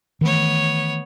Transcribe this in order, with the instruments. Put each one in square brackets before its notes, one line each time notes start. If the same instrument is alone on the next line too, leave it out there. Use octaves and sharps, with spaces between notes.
[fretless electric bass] D#3 E3 A3 [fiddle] B3 C#5